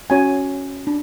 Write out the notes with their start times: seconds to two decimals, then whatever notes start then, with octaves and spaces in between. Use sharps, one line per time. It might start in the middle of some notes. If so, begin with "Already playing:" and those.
0.10 C#4 F#4 C#5 G#5
0.87 D4